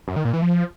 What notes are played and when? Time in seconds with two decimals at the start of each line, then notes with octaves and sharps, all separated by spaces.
0.08 F#2
0.16 D#3
0.25 A#2
0.33 E3
0.42 F3